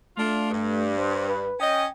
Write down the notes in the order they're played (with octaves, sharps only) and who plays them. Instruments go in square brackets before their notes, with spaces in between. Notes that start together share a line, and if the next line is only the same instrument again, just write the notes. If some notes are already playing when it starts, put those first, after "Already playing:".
[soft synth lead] A3 [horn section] D4 F4
[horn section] G2
[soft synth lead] C5
B4
[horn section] C#4 D#5 [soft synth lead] G5